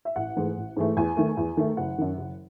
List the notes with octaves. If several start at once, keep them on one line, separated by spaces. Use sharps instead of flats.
E5
A1 F#5
G#2 E3 A3
A1
G#2 E3 A3
E2 G#5
D#3 A3
E2
D#3 A3
F#1 F#5
F#2 D#3
F#1